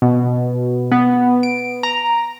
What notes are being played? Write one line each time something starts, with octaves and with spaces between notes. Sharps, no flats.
B2
B3
D7
A#5